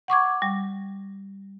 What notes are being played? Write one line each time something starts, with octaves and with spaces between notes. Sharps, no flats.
F#5 C#6 D6 G#6
G3